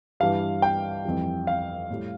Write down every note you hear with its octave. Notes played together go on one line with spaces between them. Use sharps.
G2 E3 G3 F5
G5
F2 E3 G3
F5
A2 G3